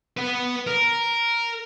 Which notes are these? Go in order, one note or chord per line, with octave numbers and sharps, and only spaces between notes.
B4 F#5
A#4